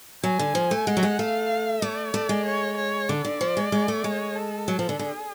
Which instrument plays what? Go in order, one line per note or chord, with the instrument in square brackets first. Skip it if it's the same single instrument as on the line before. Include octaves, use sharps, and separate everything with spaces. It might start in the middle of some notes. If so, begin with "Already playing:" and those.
[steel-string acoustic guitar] F#3 [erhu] G#5
[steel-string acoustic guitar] D3
F3
A3
[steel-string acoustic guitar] G#3 [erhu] F#5
[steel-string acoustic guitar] F#3
G#3
[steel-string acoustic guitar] A3 [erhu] F5
[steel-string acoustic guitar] A3 [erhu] D5
[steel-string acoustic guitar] A3
G#3
[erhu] C#5
C#5
[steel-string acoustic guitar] D3 [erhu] D5
[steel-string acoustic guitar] D3
F3
G#3
G#3
A3
[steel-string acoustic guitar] G#3 [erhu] C#5
[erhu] A4
[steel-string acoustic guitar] F#3
F3
D3
[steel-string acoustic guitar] D3 [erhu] G#4